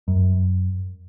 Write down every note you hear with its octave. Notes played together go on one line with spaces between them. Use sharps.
F#2